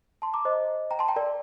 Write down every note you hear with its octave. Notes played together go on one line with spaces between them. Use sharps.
A5 C6
A#5 D6
C5 D#5
G5 A#5
A5 C6
G5 A#5
A#4 D5